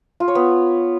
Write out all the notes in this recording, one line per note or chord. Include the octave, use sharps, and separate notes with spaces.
F4
C#5
B3